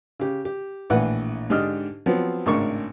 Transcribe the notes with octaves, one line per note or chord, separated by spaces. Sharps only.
C#3 G4
G4
A#1 A2 E3 B4 F#5
G#2 D3 D4 G4 D#5 F6
F3 F#3 B3 C4
G#1 A2 C#3 D4 A#4 C#6